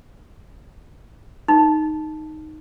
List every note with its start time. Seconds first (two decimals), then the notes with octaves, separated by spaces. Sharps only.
1.48 D#4